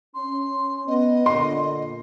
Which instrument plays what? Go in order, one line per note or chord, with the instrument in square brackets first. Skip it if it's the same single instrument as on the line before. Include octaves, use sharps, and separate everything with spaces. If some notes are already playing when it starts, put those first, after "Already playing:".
[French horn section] C#4 [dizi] C6
[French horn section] B3 [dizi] D#5
[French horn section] A#2 D3 [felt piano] C6